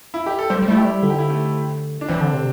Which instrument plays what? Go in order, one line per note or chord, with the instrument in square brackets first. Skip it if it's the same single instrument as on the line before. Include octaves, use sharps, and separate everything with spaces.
[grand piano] E4
G4
A4
[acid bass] G3 [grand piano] C5
[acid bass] G3
[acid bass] A3 [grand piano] E4
[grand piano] G4
[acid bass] G3
[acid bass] D3 [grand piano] E4
[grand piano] G4
E4
A3
D4
[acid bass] E3 [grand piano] C4
[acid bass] D3
C3